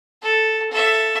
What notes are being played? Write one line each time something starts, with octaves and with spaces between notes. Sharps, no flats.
A4
A4 E5